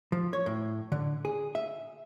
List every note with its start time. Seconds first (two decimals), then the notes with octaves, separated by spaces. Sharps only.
0.12 F3
0.33 C#5
0.46 A2
0.92 D3
1.25 G#4
1.55 E5